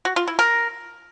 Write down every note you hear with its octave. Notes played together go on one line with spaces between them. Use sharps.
F#4
F4
E4
A#4